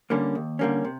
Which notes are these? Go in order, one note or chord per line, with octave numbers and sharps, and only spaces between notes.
D3 G3 A#3 C#4
D#2
D3 G3 A#3 C#4
C3